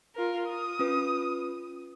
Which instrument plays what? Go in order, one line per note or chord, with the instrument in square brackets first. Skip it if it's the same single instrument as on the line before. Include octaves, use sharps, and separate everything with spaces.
[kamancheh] F4 A#4
D#6
[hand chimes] C#4 F4 B4